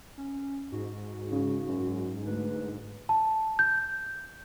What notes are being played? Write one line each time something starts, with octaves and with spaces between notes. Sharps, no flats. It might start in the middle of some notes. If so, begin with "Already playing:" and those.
C#4
G#2 F#4
C#3
F#2
D2 B4
A5
G6